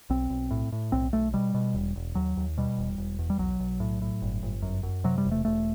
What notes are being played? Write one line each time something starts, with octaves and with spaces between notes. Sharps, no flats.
B1 C4
B1
A2
A2
B1 C4
B1 A3
B2 G3
B2
E1
E1
D#2 F#3
D#2
B2 G3
E1
E1
E2
G3
B1 F#3
B1
A2
A2
G1
G1
F#2
F#2
C3 F#3
G3
E1
A3
E1 A3